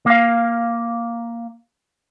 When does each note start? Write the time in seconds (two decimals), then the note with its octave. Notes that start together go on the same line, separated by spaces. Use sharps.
0.06 A#3 F5